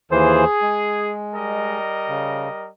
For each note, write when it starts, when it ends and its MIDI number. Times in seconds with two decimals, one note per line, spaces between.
0.11 0.44 39
0.11 0.44 52
0.11 1.13 68
0.11 0.44 72
0.62 1.78 56
1.34 2.69 55
1.34 2.69 70
1.34 2.69 75
2.09 2.49 49